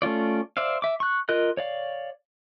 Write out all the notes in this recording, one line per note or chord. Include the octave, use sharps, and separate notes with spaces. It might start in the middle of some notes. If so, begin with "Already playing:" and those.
A3 C#4 F4 D5
C5 D5 E5 F5
E5 D6
C#6 F#6
F4 A#4 D#5 F#6
C#5 D5 F5